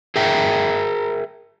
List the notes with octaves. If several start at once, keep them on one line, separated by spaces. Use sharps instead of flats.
G#4 A#4 E5 G5 A#5